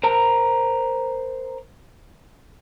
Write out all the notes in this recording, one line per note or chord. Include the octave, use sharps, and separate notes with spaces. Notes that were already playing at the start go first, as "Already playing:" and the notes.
A#4 C5 A#5